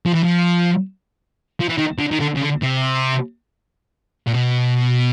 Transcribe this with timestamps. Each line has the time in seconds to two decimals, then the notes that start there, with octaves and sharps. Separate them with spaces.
0.06 F3
0.14 E3
0.24 F3
1.60 F3
1.69 E3
1.78 D#3
1.98 D3
2.11 D#3
2.20 D3
2.36 C#3
2.41 D3
2.62 C3
4.27 A#2
4.34 B2